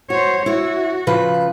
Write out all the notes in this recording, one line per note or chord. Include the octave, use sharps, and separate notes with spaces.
F#4 C5 C#5
E4 F#4 C#5
C#3 F3 B4